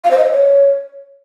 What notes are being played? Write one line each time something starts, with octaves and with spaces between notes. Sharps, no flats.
F5
C5
D#5
C5
C#5